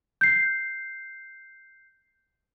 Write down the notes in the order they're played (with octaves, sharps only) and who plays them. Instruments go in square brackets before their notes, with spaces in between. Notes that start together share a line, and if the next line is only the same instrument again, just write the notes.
[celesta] G6 C7